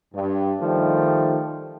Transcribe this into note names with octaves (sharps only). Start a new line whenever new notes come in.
G2
D#3 F3 G3 A3